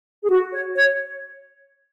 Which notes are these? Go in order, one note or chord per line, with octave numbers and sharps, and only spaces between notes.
G#4
F#4
C#5
C#5